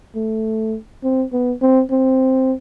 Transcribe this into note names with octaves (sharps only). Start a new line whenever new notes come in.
A3
C4
B3
C4
C4